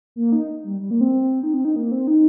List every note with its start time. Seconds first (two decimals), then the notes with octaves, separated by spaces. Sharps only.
0.16 A#3
0.32 D#4
0.64 G3
0.80 G3
0.91 A#3
1.01 C4
1.43 D#4
1.54 C4
1.65 D#4
1.76 A#3
1.91 C4
2.07 D#4